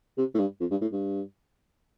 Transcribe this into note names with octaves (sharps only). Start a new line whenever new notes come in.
C3
A2
G2
F2
G2
A2
G2